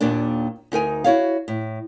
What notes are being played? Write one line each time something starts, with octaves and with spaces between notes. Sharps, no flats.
D#2 A#2 D#3 A#3 D4
D2 D#4 A#4 G#5
E4 F#4 C#5 F5
A2